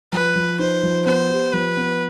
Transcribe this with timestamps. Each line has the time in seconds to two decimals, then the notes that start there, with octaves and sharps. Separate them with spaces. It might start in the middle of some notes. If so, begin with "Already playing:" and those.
0.12 F3 B4
0.36 F3
0.59 D#4 C5
0.83 F3
1.06 B3 C5
1.30 G4
1.53 F3 B4
1.77 B3